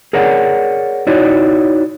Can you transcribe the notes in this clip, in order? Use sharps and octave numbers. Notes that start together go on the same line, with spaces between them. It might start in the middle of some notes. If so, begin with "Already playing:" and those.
G#4 A#4 C#5 D5 F#5
D#4 E4 F#4 C#5 D5